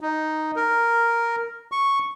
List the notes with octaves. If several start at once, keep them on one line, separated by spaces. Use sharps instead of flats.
D#4
A#4
C#6